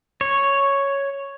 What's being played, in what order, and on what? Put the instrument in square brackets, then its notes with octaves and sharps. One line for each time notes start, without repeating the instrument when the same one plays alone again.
[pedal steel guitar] C#5